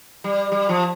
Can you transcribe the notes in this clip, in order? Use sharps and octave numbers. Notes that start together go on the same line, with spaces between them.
G3
G3
F3